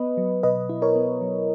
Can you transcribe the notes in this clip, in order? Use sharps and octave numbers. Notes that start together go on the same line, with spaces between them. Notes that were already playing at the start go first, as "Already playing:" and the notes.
Already playing: B3 B4 D#5
F#3
B2 B4 D#5
E4
A#4 C#5
B3
F#3